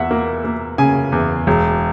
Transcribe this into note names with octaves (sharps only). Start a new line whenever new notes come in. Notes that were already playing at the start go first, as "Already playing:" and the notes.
Already playing: E2 E5 F#5
A#3
A#3
C#3 G#5
E2
E1